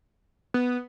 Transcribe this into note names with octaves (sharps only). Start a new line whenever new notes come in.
B3